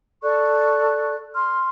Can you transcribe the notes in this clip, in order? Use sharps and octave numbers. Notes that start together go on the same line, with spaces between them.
A4 D5 C#6 F#6
C6 F6